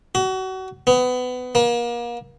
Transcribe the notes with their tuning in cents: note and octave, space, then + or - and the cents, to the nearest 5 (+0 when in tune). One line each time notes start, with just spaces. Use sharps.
F#4 +30
B3 +25
A#3 +35